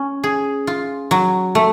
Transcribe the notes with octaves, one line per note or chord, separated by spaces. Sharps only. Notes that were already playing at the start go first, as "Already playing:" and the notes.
Already playing: C#4
G#4
F4
F#3
A3